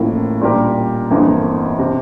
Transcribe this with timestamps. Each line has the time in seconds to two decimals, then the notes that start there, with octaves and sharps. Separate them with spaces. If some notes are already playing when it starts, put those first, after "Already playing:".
Already playing: A1 A2 F3 A#3 E4
0.41 A#2 G3 D4 G4 A#4
1.10 G1 F2 E3 A#3
1.79 C3